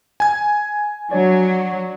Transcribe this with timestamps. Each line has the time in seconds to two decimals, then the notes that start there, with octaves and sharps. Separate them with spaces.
0.20 G#5 G#6
1.11 F#3 D4 C#5 D5